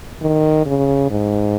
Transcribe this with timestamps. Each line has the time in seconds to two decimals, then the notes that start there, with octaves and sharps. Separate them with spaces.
0.22 D#3
0.66 C#3
1.11 G#2